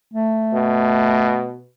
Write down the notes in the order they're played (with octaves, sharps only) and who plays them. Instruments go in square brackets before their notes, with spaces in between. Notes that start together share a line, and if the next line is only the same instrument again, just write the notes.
[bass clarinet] A3
[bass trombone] B2